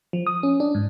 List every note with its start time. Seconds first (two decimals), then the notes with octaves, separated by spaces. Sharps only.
0.13 F3
0.27 D#6
0.43 C#4
0.60 D4
0.75 G#2